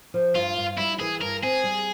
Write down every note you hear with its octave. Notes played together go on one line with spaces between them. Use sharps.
F3
G2 F4
G2
G3 E4
E3 G#4
G2 A#4
C4 G#4
G3